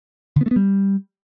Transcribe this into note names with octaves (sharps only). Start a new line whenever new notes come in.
D3
B3
A3
B3
G3